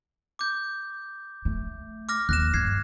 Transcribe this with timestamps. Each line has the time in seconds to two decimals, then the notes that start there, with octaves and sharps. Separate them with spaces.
0.39 D6 G6
1.45 A3
2.09 D6 F6 A#6
2.29 D#2 F#6 A#6 E7
2.54 G2 G#6 C7